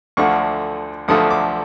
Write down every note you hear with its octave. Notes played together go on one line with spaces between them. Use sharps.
D2 D3 F3 A3 C#6
D2 D3 F3 A3 D#6
D6